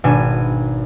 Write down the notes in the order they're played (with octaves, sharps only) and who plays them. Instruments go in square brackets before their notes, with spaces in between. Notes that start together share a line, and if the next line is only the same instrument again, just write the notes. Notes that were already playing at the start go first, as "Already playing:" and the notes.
[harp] G#1 B2 D4 G#5 D#7